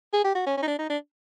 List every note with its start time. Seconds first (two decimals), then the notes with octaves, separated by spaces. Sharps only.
0.14 G#4
0.24 G4
0.35 F#4
0.46 C#4
0.57 C#4
0.63 D#4
0.67 D4
0.79 D#4
0.90 D4